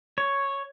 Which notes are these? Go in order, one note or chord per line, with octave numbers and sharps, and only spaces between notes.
C#5